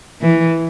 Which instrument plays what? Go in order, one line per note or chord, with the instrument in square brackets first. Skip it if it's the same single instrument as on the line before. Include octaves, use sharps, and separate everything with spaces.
[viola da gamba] E3